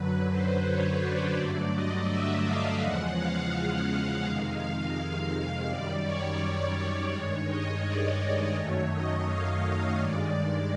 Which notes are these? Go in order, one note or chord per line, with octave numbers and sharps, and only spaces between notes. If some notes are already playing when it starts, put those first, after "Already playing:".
Already playing: F#2 D3 F#3 B4
C5
C#5
D5
G2 D3 F#3 A3
D#5
E5
F5
E2 C#3 F3 G#3 F#5
F5
F#5
F5
F2 C3 D#3 G#3
F5
F5
F5
F#2 D#3 G3 D5
C#5
C#5
G2 D#3 G#3 C#5
D#5
D5
C#5
F#2 D#3 F#3 A3
D#5
F5
F5
G2 D#3 G#3 D5